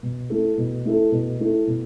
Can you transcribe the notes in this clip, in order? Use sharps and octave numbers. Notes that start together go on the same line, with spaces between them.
B2
A3 E4 A4
B2
A3 E4 A4
B2
A3 E4 A4
B2